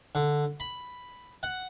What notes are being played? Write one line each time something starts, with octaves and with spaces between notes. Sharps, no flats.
D3
B5
F#5